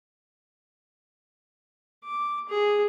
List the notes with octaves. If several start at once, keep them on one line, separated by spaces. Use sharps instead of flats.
D6
G#4